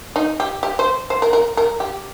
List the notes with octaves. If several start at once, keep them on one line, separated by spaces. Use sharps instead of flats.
D#4
G4
G4
C5
C5
A#4
A#4
A#4
G4